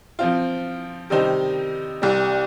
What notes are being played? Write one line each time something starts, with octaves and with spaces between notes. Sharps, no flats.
F3 C4 F4
C3 D#3 G3 D#4 C5
C2 C3 G3